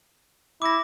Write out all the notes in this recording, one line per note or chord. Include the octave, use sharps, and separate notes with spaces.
E4 D6 A#6